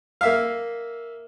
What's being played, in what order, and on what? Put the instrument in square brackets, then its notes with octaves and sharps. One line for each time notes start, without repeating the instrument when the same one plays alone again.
[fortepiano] A#3 E5 F5